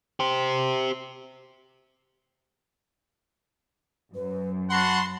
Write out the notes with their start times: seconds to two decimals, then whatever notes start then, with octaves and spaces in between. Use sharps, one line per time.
0.20 G4 C5
4.15 F#2 B4
4.70 F#4 F#5 A5 B5 C6